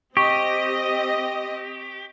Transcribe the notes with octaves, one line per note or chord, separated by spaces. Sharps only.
C4 G4 D#5 C#6